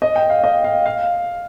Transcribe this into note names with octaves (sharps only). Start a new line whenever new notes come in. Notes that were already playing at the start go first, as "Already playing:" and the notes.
D#5
G5
F5
D#5
F5
F5